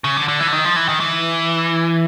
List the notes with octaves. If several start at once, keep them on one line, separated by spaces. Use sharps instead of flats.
C#3
D3
D3
E3
D3
D#3
F3
E3
D#3
E3